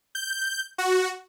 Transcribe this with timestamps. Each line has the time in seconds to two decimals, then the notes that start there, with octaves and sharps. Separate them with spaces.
0.15 G6
0.78 F#4